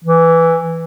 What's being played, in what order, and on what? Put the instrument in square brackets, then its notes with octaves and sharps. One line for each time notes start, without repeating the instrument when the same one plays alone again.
[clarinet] E3